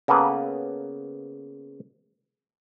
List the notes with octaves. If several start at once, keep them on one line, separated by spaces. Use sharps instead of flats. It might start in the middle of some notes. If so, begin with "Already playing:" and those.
C#3 A#3 B3 A4 B4